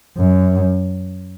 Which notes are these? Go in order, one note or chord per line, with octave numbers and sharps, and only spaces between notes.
F#2